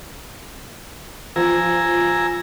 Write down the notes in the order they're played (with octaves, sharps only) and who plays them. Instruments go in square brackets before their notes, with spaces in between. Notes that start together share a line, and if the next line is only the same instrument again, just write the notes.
[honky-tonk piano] F3 [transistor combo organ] G#5 A#5 E6